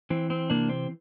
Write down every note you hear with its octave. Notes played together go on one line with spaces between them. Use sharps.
E3 C4
C4
C3 A#3 D4
C4